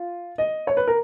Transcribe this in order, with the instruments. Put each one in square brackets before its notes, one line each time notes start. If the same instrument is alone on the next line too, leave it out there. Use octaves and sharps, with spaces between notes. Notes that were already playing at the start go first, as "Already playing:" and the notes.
Already playing: [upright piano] F4
D#5
C#5
B4
A#4